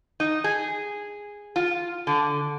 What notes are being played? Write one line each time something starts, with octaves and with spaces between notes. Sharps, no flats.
D#4
G#4
F4
D3